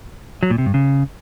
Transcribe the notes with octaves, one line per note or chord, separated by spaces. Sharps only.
F#3
A#2
C3
G2
C#3